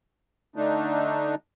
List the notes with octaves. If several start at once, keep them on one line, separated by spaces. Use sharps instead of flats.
D3 A3 D4 D#4